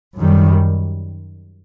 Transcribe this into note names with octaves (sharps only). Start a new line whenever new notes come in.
F#2 D#3 G3